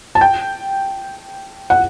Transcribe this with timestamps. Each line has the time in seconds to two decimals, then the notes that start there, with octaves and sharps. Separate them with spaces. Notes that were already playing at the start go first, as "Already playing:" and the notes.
0.15 A5
0.21 G5
1.70 F#5